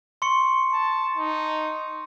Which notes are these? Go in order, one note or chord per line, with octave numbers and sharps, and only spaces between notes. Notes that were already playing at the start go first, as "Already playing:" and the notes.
C6 C#6 C#7
A5
D#4